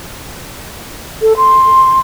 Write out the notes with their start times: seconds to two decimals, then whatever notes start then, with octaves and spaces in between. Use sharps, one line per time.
1.22 A4
1.37 C6